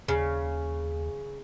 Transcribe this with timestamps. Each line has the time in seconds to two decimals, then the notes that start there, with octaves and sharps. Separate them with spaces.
0.08 D#2 C#3